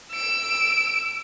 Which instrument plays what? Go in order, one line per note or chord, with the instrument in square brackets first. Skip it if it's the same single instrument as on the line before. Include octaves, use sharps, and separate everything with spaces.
[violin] E6 D7